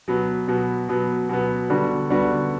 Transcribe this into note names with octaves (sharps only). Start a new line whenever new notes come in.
B2 F#3 B3
B2 F#3 B3
B2 F#3 B3
B2 F#3 B3
D3 G3 B3 F#4
D3 G3 B3 F#4